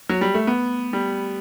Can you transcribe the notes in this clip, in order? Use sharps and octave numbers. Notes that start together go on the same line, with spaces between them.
F#3
G3
A3
B3
G3